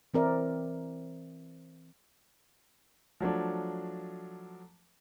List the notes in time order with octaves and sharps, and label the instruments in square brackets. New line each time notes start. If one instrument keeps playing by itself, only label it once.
[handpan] E3 C4 A#4 D5 E5
[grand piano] F3 F#3 A3 D4